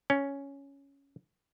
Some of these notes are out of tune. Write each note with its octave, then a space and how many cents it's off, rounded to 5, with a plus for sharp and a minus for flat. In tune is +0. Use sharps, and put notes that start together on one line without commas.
C#4 +5